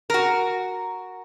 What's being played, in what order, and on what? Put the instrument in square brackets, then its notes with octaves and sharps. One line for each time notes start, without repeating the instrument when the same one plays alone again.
[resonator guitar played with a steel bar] F#4 A#4